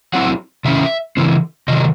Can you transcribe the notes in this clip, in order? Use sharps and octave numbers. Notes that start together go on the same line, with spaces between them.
F#3 C4 E4 F#5
C3 D#3 C#4 E4 E5
C#3 E3 C4 E4
C3 D#3 F#3 D#5